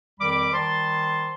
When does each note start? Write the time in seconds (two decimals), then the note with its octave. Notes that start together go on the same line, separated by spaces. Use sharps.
0.20 F2 D#3 G3 B5 D6
0.53 D#3 G3 C5 A5 C6